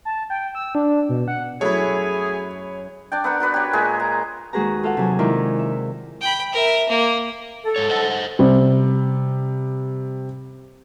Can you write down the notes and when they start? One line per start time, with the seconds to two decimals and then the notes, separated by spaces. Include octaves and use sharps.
0.05 A5
0.30 G5
0.55 E6
0.75 D4
1.09 B2
1.28 F#5
1.61 F#2 F#3 A3 E4 G#4 C#5 G#5 B5
3.12 D4 D5 G5
3.24 B3 A#4 F#5
3.40 F#4 A#4 B4 D5
3.54 G4 C#5
3.73 A#2 G#3 G#4
4.00 A#5
4.53 D#2 G#3 F#4 G#4 B4 A#5
4.83 F4 A4 F5 F#5
4.97 C3 F#3 G#5
5.19 D#3 G#3 E4 F4 A#4 D5
5.59 E5
6.21 G5 B5
6.52 A#4 E5
6.89 A#3
7.64 A4
7.76 G#2 C#5
7.89 C5 D#5 F#5
8.39 C3 G3